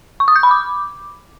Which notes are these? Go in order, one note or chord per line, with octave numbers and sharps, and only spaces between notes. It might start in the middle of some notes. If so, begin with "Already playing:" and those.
C#6
D#6
G6
B5
D6